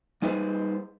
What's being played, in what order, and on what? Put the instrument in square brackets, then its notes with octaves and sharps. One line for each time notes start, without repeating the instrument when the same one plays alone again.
[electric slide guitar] G3 D#4 G#4 B4 C5